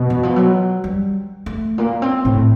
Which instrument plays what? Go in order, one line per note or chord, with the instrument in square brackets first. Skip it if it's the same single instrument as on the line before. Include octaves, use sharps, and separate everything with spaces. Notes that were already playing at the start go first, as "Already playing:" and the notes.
Already playing: [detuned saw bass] B2
[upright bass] E3
F3
F#3
G3
A3
[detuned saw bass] A#2 [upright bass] A#3
[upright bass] C4
[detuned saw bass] A2 [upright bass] C4